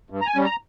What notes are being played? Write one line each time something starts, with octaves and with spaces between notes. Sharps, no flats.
G2
A#5
G#5
G3 C#4
A#5